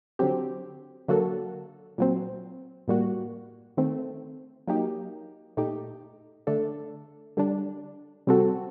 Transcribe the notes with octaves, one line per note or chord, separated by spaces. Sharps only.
D3 F#3 C4 G4
D3 F#3 A#3 F#4 A4
A#2 F#3 C4
A2 G3 A#3 F#4
D#3 A3 C4
F#3 A#3 D#4 G4
A#2 A3 D#4 G4
D3 A3 D4 A4
D3 G3 D4
C3 G3 C4 F#4 A4